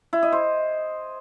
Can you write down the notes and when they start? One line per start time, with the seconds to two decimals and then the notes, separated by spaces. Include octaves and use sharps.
0.13 E4
0.23 D#5
0.32 C5